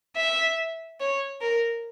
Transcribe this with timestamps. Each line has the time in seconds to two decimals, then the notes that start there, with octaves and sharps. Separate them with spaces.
0.16 E5
1.00 C#5
1.41 A#4